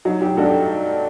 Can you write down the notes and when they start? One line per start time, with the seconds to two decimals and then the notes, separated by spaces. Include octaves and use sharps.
0.05 F#3 D#4
0.21 F#3 D#4 G4
0.37 G2 F#4 A4
0.45 D#4 G4